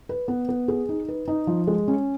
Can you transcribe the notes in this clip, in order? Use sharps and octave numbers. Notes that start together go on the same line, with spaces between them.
B4
B3
B3
G#4
D#4
B4
D#4
F3
G#3
C#4